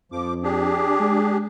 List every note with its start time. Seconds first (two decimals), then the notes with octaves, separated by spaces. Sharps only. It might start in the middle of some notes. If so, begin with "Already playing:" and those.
0.12 F2 F3 D6
0.43 D4 G4 G#4
1.00 G#3